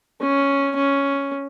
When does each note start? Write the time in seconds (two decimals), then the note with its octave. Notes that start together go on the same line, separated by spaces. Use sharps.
0.21 C#4
0.76 C#4